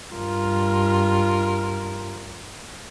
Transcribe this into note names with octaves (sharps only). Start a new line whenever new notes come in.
G2 F4 A#4